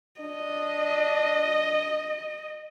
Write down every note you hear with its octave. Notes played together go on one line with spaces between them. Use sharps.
D4 D#5